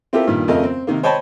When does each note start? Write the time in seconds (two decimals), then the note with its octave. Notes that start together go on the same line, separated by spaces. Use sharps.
0.13 C4 E4 F4 G4 A4 A#4
0.27 G2 A#2 D#3
0.48 F2 C#3 A3 C#4 A#4 D#5
0.64 C4
0.87 C3 D#3 A#3
1.03 C5 C#5 D#5 G5 A5 B5